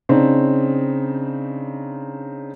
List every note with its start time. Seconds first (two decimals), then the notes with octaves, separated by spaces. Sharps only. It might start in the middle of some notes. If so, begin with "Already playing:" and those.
0.09 C#3 C4 D4 D#4